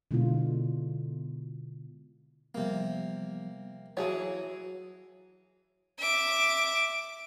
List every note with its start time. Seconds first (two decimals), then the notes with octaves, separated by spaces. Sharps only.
0.11 B2 D3 G#3 B3 E4 F4
2.55 C3 F3 G3 A#3 B3
3.97 E3 F#3 G#4 C#5 A#5
5.99 E5 D6